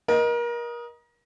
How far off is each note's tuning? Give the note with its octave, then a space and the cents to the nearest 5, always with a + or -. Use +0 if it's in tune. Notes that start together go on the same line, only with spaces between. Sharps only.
A#4 +30 D#5 +0